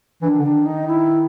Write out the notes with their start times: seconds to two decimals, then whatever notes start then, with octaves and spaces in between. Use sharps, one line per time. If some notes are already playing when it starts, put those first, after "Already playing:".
0.22 E3 D4
0.30 D#3
0.38 D3
0.44 D#3 D4
0.66 D#4
0.88 E4